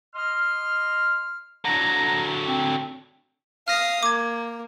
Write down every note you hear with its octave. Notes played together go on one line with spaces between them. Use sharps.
D#5 C6 F6
D3 F#3 A#5
C4
F5 D#6 F6 A#6
A#3 D6 G#6